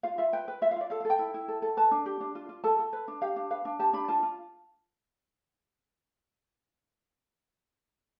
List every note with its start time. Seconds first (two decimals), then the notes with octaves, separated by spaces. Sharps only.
0.03 F4 F5
0.18 F4 E5
0.33 B4 G5
0.48 B4
0.62 F4 E5
0.71 F5
0.76 F4 D5
0.90 A4 F5
1.00 F5
1.05 A4
1.10 G5
1.19 E4
1.34 E4
1.48 A4
1.62 A4
1.77 B4 A5
1.91 D4
2.06 G4
2.21 D4
2.35 F4
2.49 F4
2.64 A4 A5
2.79 A4
2.93 B4
3.08 D4
3.22 G4 F5
3.36 D4
3.51 B4 F5
3.65 D4
3.79 G4 A5
3.93 D4 B5
4.08 F4 A5
4.23 F4